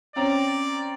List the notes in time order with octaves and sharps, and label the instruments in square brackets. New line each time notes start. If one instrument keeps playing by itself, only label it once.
[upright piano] C4 C#4 A#5 [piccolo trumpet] D5